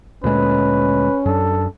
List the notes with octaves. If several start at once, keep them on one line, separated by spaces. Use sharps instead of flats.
D2 A#2 G#3 C#4 B4
F#2 D4 A4